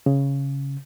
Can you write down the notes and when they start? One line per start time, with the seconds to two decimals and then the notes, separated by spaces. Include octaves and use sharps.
0.06 C#3